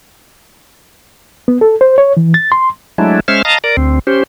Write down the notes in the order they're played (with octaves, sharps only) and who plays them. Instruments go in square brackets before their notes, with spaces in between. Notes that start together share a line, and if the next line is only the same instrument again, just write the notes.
[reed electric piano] B3
A4
C5
C#5
E3
A6
C6
[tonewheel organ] F#3 G#3 A3 D4 E4
G#3 C#4 C5 E5 F6
D#5 F5 A5 A#5
A#4 D5
D2 C4
C#4 G4 C5